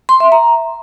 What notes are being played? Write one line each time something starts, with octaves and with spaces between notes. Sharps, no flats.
C6
E5
A#5